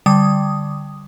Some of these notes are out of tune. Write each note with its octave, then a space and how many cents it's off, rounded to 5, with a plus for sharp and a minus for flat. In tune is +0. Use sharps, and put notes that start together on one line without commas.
D3 +0 G3 +0 D#6 +0